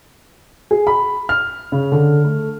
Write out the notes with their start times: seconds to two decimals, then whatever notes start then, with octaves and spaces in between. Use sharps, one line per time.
0.71 G#4
0.87 B5
1.29 F6
1.72 C#3
1.92 D3
2.25 A3